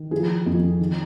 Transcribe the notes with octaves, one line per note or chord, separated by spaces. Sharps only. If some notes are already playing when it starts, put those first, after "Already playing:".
Already playing: D#3
F3 G#4
F2
D#3